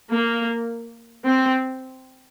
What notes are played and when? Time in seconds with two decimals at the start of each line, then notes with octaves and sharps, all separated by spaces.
0.11 A#3
1.27 C4